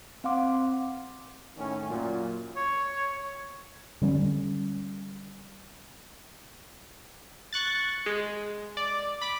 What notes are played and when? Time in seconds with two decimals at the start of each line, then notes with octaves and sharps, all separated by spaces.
0.24 C4 F5 F#5 C6 D6
1.57 A2 D#3 C#4
1.87 F#2 A#2
2.56 C#5
4.02 D3 G3 C4 C#4
7.53 C#6 F#6 A6
8.06 G#3
8.77 D5
9.22 B5 D6